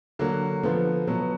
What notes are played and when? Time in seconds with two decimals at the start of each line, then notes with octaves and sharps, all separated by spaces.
0.19 D3 F#3 A#3
0.63 D3 F3 B3
1.07 B2 F#3 B3